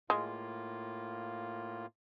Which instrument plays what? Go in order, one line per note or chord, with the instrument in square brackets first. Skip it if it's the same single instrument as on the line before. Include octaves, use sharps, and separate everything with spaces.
[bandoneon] A2 A#3 F4 [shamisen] G#3